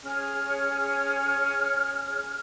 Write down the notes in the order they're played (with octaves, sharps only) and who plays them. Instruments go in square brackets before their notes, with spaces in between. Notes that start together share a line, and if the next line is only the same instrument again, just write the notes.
[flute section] C#4 G#4 C#5 F6